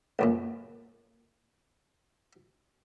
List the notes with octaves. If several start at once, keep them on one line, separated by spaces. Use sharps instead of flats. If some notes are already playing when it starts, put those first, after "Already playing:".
C#2 F#2 A#2